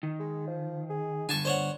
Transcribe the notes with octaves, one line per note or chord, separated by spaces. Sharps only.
D#3
G#3
F3
G#4
G2 D3 G#5 A5 C#6
D4 C5 C#5 F#5